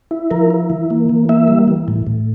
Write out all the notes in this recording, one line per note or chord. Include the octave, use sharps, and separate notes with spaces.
E4
F3 A#4
E4
E3
A#3
E3
A#3 E5
G3
E3
A2
A2